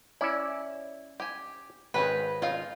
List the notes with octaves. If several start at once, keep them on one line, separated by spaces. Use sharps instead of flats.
C#4 E4 D5 E5
G4 G#5
G#1 C4 C#4 D#4 B4
C#4 D#4 F4 F5